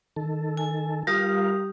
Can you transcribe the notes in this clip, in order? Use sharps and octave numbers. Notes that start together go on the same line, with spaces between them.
D#3 A4
G#5
G3 F4 G4 A#4 F5 D#6